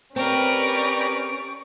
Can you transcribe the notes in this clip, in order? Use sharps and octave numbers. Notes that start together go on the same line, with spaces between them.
C4 C#4 G4 A#4 B4 D5 C#6 D7